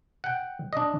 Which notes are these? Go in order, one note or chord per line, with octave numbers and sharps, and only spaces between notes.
F#5 G5
D4 D#5